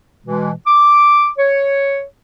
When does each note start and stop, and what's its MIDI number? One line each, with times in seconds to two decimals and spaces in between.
0.25 0.51 47
0.25 0.51 52
0.25 0.51 56
0.67 1.28 86
1.38 2.03 73